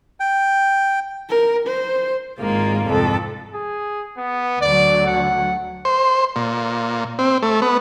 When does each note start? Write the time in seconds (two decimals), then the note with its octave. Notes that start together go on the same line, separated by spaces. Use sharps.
0.20 G5
1.29 A#4
1.67 C5
2.40 G#1 G#3 A#3 F4
2.88 C2 F2 G#2 A4
3.54 G#4
4.18 B3
4.61 D2 D3 F#3 D5
5.07 F#5
5.85 C5
6.36 A#2
7.19 C4
7.42 A3
7.62 B3